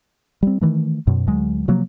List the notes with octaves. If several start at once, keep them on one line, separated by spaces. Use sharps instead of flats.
G3 C4
D#3 E3 A3
F#2 B2
D2 F#3 G#3
C3 F3 F#3 A#3